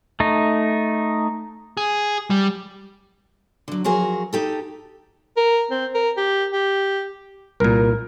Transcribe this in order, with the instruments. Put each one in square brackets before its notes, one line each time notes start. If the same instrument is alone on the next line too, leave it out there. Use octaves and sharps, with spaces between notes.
[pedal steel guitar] A3 D#4
[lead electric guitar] G#4
G3
[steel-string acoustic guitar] D3 F#3
F3 F#3 F#4 G#4 A#4
D#4 G4 A4
[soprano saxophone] A#4
C4
A#4
G4
G4
[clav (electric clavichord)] C2 A#2 [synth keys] A#4